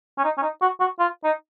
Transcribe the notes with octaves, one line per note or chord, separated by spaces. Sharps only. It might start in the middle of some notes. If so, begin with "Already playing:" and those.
C#4
D#4
C#4
D#4
F#4
F#4
F4
D#4